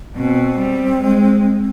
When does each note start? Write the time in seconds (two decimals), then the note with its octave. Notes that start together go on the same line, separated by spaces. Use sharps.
0.16 B2 C4
0.58 G3
1.01 G#3